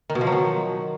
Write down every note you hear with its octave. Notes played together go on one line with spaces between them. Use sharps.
D#3
B2
F3
F#3
D#3